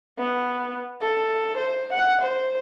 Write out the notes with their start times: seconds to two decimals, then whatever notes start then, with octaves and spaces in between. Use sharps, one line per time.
0.18 B3
1.01 A4
1.58 C5
1.93 F#5
2.22 C5